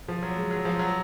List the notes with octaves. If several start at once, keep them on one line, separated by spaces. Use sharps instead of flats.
F3
F#3
G#3
F#3
F3
F#3